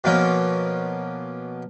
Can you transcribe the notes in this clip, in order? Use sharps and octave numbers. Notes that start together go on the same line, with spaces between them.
B2 F3 A#3 C#4